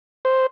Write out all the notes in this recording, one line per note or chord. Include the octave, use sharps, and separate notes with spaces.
C5